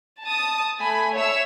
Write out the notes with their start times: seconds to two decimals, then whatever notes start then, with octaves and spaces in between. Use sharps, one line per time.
0.23 A5 D#6
0.82 A3 G#5 B5
1.15 C#5 E5 E6